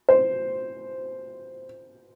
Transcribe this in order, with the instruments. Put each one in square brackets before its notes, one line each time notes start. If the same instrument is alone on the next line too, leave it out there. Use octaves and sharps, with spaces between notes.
[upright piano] C5